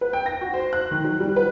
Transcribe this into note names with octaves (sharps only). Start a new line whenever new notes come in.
B4
G5
A#6
F#4
C5
F#6
D#3
F#3
G3
B4